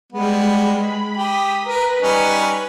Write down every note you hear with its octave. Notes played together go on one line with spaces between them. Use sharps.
G3 G#3 B3
B5
G4 D#6 B6
A#4 B4
G3 C#4 D#4